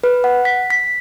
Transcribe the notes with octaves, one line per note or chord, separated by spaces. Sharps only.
B4
F#5
B6
B6